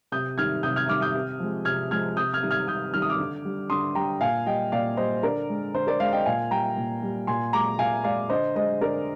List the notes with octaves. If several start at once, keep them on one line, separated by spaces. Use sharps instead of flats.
C3 D#6 G6
D#3 G3 F6 G#6
C3 D#6 G6
F6 G#6
D#3 G3 D6 F6
D#6 G6
C3
F3 G#3
C3 F6 G#6
F3 G#3 F6 G#6
C3 D#6 G6
F6 G#6
D#3 G3
F6 G#6
C3 D#6 G6
D#3 G3 F6
D#6
D6 F6
D3
G3
D3 C6 D#6
G3 G5 A#5
A#2 F5 G#5
G3 D#5 G5
A#2 D5 F5
G3 C5 D#5
D3 A#4 D5
G#3
D3 C5
A#4 D5
G#3 D5 F5
D#5 G5
A#2 F5 G#5
G3 G5 A#5
A#2
G3
A#2 G#5 C6
G#3 A#5 D6
A#2 F5 G#5
G#3 D5 F5
D3 C5 D#5
G#3 C5 D#5
D3 A#4 D5